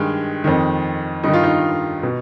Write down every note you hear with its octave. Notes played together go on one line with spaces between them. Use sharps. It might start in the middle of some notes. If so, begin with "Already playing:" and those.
Already playing: G2 D#3 G#3
F2 D#3
G2 D#3 D#4
F4
D#4
B2